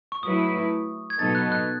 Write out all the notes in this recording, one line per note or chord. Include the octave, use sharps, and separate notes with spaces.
C#6
F#3 A3 E4 B4 D#6
G#6
B2 F#3 B3 D#4 A4 A6
F#6
F#6